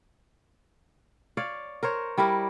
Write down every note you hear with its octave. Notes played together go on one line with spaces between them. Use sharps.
C#5 D5 F5
A#4 C5 C#5
G3 E4 G4 A#4